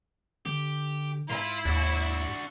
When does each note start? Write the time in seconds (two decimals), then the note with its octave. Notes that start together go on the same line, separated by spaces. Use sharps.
0.46 D3 G4
1.30 G#2 E4 F4
1.65 D#2 D4 F#4